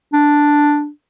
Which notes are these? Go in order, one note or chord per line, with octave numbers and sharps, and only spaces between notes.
D4